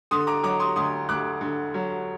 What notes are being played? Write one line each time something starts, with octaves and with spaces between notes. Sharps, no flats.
D3 C6 D#6
A#5 D6
F#3 A#5 D6
C6 D#6
D2 C6 D#6
D2 D6 F#6
D3
F#3